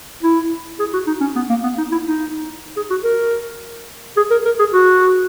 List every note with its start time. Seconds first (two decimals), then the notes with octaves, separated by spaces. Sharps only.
0.23 E4
0.79 G#4
0.93 F#4
1.07 D#4
1.21 C#4
1.36 B3
1.50 A#3
1.64 B3
1.78 D#4
1.92 E4
2.06 D#4
2.77 G#4
2.90 F#4
3.04 A#4
4.17 G#4
4.31 A#4
4.45 A#4
4.59 G#4
4.74 F#4